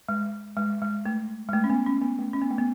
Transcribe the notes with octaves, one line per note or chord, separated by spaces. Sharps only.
G#3
G#3
G#3
A3
G#3
A3
C#4
B3
C#4
B3
A3
C#4
B3
A3
B3